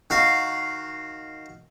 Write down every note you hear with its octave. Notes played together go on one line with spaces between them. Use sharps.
D#3 F#4 F5